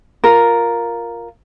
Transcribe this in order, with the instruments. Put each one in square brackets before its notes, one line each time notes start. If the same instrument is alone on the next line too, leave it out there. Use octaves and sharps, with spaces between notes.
[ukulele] F4 A#4